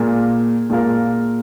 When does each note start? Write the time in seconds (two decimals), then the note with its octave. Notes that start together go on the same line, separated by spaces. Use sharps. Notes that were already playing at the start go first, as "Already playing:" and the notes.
Already playing: A#2 G#3 F4 A#4
0.70 A#2 G#3 F4 A#4